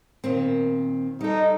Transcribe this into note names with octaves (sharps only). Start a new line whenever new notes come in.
A#2 D#3 C4
G3 D#4 A4